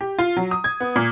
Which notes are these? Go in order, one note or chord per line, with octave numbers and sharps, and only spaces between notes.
G4
F4
F#3
D#6
G#6
B3
A#2